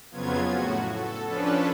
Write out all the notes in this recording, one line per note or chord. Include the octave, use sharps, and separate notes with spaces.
F2 C#3 F#3 B3 F4 G#6
A2 F#4
A4
F3 C#4 D4 A4 B4